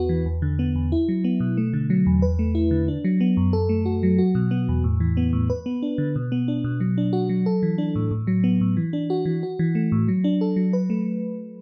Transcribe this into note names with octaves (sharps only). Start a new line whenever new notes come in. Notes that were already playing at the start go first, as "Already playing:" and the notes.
Already playing: E2 B3 F#4 B4
E3
E2
D3
B3
E2
E4
F#3
B3
B2
A3
D3
F#3
E2
B4
A3
E4
D3
D4
F#3
B3
F#2
A4
A3
F#4
F#3
F#4
B2
B3
E2
A2
E3
B3
A2
B4
B3
D4
D3
B2
B3
D4
B2
F#3
D4
F#4
F#3
A4
E3
D4
A2
A2
F#3
B3
A2
E3
D4
F#4
E3
F#4
E3
A3
A2
F#3
D4
A4
F#3
B4
A3